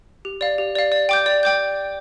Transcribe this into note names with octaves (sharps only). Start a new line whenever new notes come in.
G4
D5 F5
G4
D5 F5
D5
G5 D6 G6
D5
G5 D6 G6